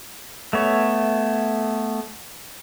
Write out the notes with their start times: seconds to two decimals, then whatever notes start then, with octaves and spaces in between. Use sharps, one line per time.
0.53 A3 B3 C#5